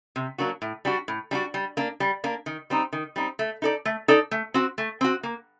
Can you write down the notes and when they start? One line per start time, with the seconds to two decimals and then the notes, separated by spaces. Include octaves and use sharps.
0.16 C3
0.38 F#3 A#3 D4 F#4
0.62 A2
0.85 G3 D4 F#4
1.08 A2
1.31 G3 D4 F#4
1.54 G3
1.77 A#3 D4
2.00 G3
2.24 A#3 D4
2.46 D#3
2.70 G3 C4 D#4
2.93 D#3
3.16 G3 C4 D#4
3.39 A3
3.62 D#4 A4 D5
3.85 A3
4.08 D#4 A4 D5
4.31 A3
4.54 C4 F#4
4.78 A3
5.01 C4 F#4
5.23 A#3